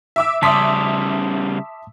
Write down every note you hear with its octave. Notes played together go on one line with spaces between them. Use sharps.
E5 D6 E6
C#3 G3 E5 A5 C6 D6 D#6 B6